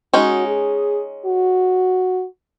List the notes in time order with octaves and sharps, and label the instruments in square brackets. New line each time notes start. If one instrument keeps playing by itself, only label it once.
[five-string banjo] G#3 C#4 D#4 [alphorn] F#4
[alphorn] G#4
F#4